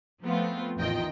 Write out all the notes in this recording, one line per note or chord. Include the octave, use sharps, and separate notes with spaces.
F3 A3 B3 C4 F4
A1 E2 D#3 F4 D#5 G5